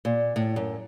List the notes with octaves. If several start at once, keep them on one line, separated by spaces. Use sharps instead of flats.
A#2
A2
F#2